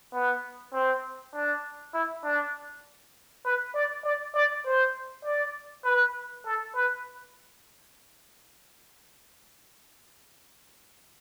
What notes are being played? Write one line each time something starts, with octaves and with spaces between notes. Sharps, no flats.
B3
C4
D4
E4
D4
B4
D5
D5
D5
C5
D5
B4
A4
B4